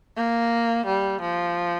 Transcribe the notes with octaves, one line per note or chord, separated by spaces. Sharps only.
A#3
G3
F3